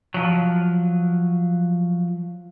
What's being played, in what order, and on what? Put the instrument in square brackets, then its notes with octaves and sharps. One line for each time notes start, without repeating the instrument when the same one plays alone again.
[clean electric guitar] F3 F#3